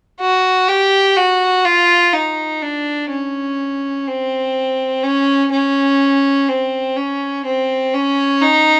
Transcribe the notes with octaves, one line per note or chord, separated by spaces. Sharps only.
F#4
G4
F#4
F4
D#4
D4
C#4
C4
C#4
C#4
C4
C#4
C4
C#4
D#4